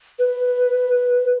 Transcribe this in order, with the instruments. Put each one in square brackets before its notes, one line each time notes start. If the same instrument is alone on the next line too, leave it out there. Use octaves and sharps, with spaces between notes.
[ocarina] B4